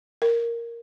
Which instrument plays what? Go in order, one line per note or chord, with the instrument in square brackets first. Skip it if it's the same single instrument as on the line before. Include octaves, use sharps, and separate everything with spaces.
[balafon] A#4